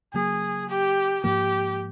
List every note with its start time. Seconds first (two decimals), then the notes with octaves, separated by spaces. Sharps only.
0.13 C#3 F#3 A#3 G#4
0.69 G4
1.24 G#2 F3 A#3 G4